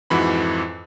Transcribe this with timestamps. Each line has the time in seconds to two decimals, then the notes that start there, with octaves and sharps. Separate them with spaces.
0.10 F2 G#2 E3 F#4 B5